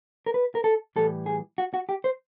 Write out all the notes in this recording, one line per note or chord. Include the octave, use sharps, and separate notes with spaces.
A#4
B4
A#4
A4
A2 E3 G3 A4
G#4
F#4
F#4
G4
C5